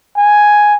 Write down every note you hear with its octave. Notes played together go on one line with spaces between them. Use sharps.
G#5